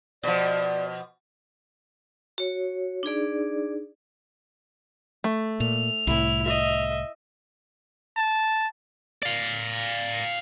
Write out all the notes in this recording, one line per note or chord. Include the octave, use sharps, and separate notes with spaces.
B2 F3 D5
F#4 C#5
D4 D#4 G#4 D5
A3
A#2 F7
C2 A2 E4
D#5 E5
A5
D5 F5